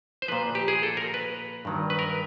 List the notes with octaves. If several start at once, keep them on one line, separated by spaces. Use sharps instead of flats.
C5
A#2 F3 B4
G4
G#4
A4
A#4
B4
G2 D#3 F#3
B4
A#4